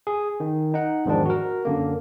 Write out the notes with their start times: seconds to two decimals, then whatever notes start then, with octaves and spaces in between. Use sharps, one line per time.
0.07 G#4
0.40 D#3
0.74 D#4 F#5
1.05 E2 G#2 D#3 F3 D4
1.25 F#4 A#4
1.65 F#2 D3 A#3